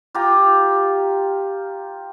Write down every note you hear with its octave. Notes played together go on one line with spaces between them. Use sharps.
F4 G4 G5 A#5